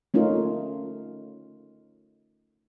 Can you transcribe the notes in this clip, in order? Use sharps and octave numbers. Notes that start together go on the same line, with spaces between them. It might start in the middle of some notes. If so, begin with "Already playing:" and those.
A3 C#4 D#4 F4 A#4